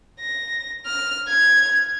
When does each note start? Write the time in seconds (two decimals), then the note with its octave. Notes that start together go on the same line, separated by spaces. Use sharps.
0.20 A#6
0.86 F6
1.29 G#6